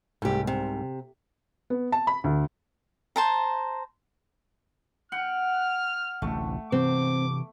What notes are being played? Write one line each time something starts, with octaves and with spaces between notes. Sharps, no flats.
C2 G#2 A3 G4
C3
B3
A5
B5
D2
C5 A5 A#5
F#5 G5 F6
A1 D2 C3 A3
C3 E3 C4 D6